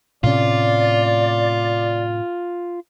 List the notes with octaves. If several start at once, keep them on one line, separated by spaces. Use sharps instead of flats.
A2 C3 C#4 F4 D5